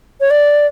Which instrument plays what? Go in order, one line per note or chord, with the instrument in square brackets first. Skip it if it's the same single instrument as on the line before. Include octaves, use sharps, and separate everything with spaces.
[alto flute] C#5
D5